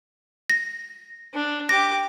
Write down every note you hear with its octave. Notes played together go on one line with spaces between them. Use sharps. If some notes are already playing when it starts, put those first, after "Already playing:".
A#6
D4
G4 D6 A#6